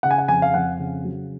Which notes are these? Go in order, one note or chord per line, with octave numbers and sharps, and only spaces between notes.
C#3 F#5
G#5
F#5
F2 G#5
F5
F2 F#5
C#3
F#3